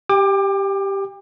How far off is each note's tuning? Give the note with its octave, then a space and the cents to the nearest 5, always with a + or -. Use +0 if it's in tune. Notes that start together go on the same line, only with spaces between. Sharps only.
G4 +0 G5 +40 D6 +25